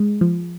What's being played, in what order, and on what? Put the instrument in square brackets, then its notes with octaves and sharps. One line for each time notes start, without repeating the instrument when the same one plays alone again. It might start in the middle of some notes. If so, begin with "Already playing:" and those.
Already playing: [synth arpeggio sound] G#3
F3